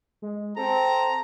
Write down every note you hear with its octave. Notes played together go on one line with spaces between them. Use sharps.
G#3
C4 A4 A#5